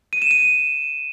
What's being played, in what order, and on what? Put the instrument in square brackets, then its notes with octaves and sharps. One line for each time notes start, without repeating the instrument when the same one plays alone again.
[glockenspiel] D#7
E7
D#7